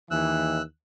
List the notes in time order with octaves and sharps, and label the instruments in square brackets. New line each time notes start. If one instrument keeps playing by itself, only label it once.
[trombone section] D#2 E3 [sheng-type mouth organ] E6 F#6